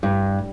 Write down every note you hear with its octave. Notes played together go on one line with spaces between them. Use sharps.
G2